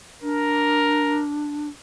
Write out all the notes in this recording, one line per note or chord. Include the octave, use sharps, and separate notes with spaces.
D4 A#4